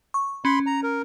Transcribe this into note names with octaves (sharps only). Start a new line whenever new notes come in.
C#6
C#4 B5 C6
A#5
A#4